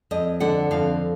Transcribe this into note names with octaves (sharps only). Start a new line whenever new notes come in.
F2 D#5
D3 F#5
F2 F5